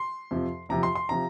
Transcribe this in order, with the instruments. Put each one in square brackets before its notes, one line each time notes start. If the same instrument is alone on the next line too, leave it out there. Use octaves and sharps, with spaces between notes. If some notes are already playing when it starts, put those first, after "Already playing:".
Already playing: [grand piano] C6
F2 C3 F3
F2 C3 F3 A#5
C6
C6
C3 F3 A#5